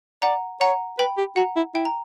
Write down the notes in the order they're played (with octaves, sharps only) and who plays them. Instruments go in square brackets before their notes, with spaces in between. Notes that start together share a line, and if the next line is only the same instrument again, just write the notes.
[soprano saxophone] D5 [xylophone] F#5 A#5
[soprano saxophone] C#5 [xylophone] F#5 A#5
[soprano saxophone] B4 [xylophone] G5 B5
[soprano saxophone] G4
[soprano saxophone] F#4 [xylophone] F#5 A#5
[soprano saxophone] E4
[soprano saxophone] E4 [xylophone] G5
[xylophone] A#5